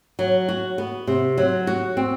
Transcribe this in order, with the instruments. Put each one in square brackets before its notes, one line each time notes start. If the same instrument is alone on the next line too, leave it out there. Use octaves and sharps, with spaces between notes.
[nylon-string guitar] F#3
F#4
B3
C3
F#3
F#4
C4